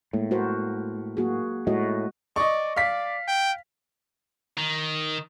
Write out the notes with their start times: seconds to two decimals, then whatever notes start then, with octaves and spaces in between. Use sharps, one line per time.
0.13 A2 G#3 A#3
0.31 F#4 A#4 C5
1.17 A#3 F#4 G#4
1.67 A2 G#3 F#4 D#5
2.36 D5 D#5 C#6
2.76 D5 F5 B6
3.28 G5
4.58 D#3